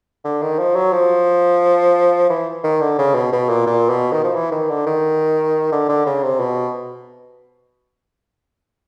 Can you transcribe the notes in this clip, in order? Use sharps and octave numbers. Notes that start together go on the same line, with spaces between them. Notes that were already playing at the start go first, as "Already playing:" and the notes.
D3
D#3
F3
F#3
F3
E3
D#3
D3
C#3
B2
B2
A#2
A#2
B2
D#3
F3
E3
D#3
D3
D#3
D3
D3
C#3
C3
B2